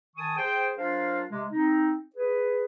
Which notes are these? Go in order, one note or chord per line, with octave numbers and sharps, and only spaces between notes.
D#3 G#5 A5 C#6 D#6
G#4 C5 G5
F#3 D4 F4 A#4 C5 F5
C3 G#3
C4 D#4
G#4 B4